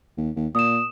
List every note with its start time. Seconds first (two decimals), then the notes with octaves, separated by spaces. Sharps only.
0.17 D#2
0.36 D#2
0.55 A#2 D#6 E7